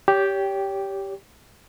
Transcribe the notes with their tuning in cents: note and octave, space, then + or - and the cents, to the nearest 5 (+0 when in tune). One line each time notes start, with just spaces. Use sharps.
G4 +0 C#5 +30 G5 +0